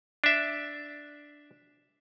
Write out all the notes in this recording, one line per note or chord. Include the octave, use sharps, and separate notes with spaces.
D4 E5